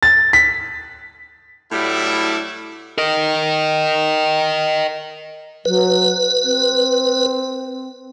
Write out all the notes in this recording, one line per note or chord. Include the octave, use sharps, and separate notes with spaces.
A6
B6
A2 F#3 G3 D4 E4
A#4 D#5
F#3 B4
C4